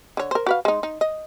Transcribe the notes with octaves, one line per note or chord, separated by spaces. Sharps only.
D3 C#5
A#4 C5
F#4 B4 F5
G#3 D#4
D#4
D#5